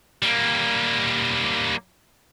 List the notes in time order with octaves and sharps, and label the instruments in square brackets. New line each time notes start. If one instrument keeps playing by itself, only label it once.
[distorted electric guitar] G3 A#3